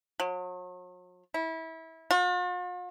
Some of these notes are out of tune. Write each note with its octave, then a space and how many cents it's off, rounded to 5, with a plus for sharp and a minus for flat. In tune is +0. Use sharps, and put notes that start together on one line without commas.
F#3 -40
E4 -25
F4 +45